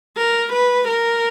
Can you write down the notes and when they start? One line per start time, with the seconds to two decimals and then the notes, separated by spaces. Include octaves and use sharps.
0.17 A#4
0.53 B4
0.88 A#4